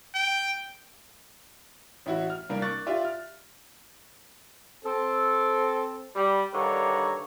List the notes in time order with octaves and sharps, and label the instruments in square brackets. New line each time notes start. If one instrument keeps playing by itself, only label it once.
[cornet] G5
[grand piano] A1 E4 F#4
F6
C2 A#3 D4 A#4
C#6 D6 F#6 A6
F4 G4 D5 E5
F6
[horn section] C4 A4
G3
G2 D3 D#3 C#5 A#5